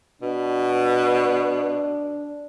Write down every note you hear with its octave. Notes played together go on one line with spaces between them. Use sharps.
B2 D4